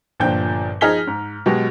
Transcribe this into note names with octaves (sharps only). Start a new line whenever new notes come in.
G1 A#2 F3 D4 G5 G6
F3 D#4 G#4 F6 B6 G7
G#2
B2 F#3 G#3 G4